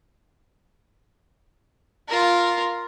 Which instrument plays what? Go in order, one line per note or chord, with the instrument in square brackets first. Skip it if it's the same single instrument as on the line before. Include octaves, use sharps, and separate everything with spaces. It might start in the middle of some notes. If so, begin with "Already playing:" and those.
[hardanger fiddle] F4 A#4